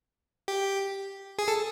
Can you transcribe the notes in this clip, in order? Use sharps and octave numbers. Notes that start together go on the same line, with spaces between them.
G4
G#4
A4